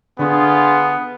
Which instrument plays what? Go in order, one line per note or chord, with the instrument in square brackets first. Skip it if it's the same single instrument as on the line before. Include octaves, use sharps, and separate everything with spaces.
[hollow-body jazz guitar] D3 [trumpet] B3 [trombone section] F4 G#4